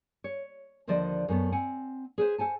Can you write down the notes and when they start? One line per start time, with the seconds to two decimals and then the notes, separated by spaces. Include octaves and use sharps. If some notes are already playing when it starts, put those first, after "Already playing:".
0.24 C#5
0.87 D#2 D3 F3 C5 D5 D#5
1.28 F#2 A3 B3
1.52 C4 F#5 G#5
2.18 G#4 B4 C5
2.38 A4 C5 G#5 A5